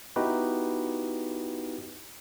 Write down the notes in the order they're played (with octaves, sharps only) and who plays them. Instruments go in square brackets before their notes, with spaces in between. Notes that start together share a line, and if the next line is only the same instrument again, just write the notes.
[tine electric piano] B3 D#4 E4 F#4 G4 B4